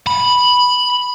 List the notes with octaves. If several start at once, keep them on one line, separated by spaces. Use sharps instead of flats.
B5